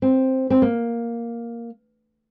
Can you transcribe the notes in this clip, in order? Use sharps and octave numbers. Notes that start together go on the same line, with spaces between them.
C4
C4
A#3